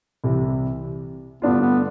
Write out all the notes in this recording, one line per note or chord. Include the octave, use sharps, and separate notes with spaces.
C2 C3 E3
G2 D3 A3 B3 D4 F4
B3